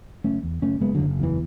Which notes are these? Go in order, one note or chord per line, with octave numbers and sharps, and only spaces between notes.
F#1 A3 C#4
E2
F#1 A3 C#4
F#1 G#3 B3
F#1 D3 F#3
E2 E3